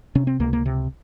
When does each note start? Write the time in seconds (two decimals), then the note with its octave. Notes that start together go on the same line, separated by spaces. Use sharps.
0.15 C3 C#4
0.27 C4
0.40 C#2 A#3
0.53 A#3
0.66 C3